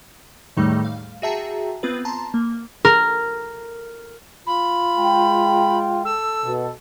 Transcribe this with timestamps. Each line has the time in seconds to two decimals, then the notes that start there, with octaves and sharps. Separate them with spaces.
0.57 E2 A2 D#3 G3 A3 D#4
0.85 F5
1.22 F#4 G#4 E5 G5 A5 A#5
1.83 B3 C4 F4 B4
2.05 A5 A#5 C6
2.34 A#3
2.85 A#4
4.47 F4 B5
4.97 G#3 G5
6.05 A4 E6
6.44 B2